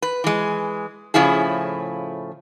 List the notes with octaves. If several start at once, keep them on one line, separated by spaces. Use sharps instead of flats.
B4
E3 G#3
A2 C#3 F3 E4 G#4